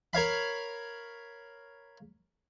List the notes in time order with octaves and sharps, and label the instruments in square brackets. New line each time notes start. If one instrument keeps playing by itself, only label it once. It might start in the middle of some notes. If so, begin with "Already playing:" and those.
[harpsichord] A#4 C#5 F5 B5